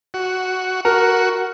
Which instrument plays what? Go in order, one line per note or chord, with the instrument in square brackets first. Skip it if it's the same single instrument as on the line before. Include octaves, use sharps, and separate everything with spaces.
[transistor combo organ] F#4
[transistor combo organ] F#4 [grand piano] A#4